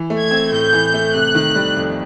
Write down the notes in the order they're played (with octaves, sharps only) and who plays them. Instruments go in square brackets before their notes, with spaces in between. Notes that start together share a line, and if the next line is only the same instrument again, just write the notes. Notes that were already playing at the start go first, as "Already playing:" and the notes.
Already playing: [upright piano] E3
A3
[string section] G#6
[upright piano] C4
[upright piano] A2 [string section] G6
[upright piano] E3
A3
[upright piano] C3 [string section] F#6
[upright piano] D#3
G3
F2